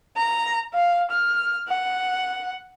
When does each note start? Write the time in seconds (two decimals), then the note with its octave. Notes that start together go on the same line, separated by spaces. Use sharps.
0.17 A#5
0.74 F5
1.11 F6
1.69 F#5